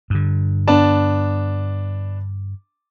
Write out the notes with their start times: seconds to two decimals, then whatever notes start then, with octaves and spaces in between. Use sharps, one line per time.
0.10 G2 D3
0.68 B3 D4 A5